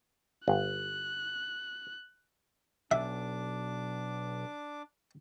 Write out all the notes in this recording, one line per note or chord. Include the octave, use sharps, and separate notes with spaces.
G1 F#6
B1 D4 E5 D6